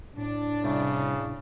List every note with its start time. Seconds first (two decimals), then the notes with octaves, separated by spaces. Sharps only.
0.17 A2 D4
0.64 C2 C#3